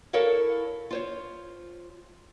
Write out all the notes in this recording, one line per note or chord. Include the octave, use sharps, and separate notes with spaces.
E4 A4 A#4 C#5 F5
F4 C5 C#5